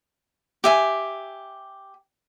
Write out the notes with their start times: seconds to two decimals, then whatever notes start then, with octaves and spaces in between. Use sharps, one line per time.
0.64 G4 E5 G#5